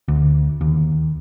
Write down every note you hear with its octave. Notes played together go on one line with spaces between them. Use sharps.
D2
D#2